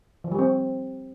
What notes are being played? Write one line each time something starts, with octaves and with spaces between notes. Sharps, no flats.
F3
G3
C4